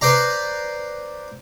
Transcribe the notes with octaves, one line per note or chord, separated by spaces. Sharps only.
B4 C5 D5 A#5